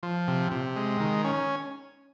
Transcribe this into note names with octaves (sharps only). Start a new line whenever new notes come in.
F3
C3
C3
G#3
D#3
C#4